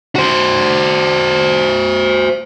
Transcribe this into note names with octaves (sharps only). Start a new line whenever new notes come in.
F#4 C5